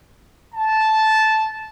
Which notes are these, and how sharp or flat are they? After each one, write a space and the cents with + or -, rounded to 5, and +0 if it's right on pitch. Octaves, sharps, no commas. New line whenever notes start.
A5 -10